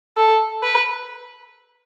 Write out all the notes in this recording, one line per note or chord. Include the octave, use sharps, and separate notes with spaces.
A4
B4